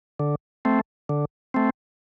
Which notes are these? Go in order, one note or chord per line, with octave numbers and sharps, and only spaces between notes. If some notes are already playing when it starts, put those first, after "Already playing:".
D3
A3 C4
D3
A3 C4